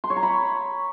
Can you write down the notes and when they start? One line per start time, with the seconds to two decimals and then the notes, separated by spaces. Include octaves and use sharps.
0.04 C6
0.10 C#5
0.16 A#5
0.23 B5